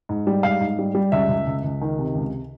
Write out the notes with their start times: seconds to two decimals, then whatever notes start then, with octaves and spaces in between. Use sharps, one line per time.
0.09 G#2
0.27 G3
0.43 G#2 F5
0.60 G#2
0.79 G3
0.95 G3
1.12 C#2 E5
1.29 C#2
1.47 C#2
1.64 C#2
1.81 D#3
1.99 C3
2.15 C#2